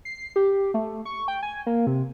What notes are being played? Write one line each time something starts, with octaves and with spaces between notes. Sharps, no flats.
C7
G4
A3
C#6
G5
G#5
A#3
C3